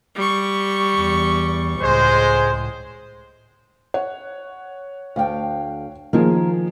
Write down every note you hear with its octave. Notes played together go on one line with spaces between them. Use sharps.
G3 C#6
E2
C#2 A2 G#3 C5
C#5 F#5
D2 F5 G5
D#3 F3 A#3 G#4